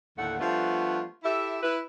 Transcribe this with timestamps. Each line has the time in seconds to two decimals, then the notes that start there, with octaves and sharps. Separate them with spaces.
0.17 D#2 A2 D3 A3 F#5
0.40 F3 G3 A3 B3 D4 F4
1.24 E4 G4 A4 E5
1.62 E4 B4